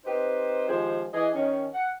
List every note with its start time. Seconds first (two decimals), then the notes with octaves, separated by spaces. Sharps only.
0.05 C4 D#4 G4 B4 C5
0.69 D#3 F3 G#3 G4 G#4 C5
1.14 E3 G#4 D#5
1.35 D#3 C#4
1.74 F#5